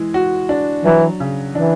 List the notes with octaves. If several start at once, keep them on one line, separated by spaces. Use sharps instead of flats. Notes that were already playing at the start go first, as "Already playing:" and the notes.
Already playing: E3 G#3
F#4
D4
E3 F#3
C#3
E3 D4